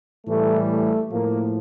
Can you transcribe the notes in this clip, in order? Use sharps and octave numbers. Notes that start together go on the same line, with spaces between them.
A2 E3 G3 A3
A3
A2 F3 A#3